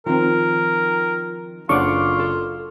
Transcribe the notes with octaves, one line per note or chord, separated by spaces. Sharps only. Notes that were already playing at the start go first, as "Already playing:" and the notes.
D#3 F3 C4 A#4
F#1 D4 F4 A4 C#5 F#5 C#6 D6
A4